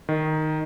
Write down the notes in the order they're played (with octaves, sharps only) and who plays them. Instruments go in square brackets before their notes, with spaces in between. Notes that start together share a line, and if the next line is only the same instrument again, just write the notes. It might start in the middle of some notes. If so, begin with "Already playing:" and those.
[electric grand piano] D#3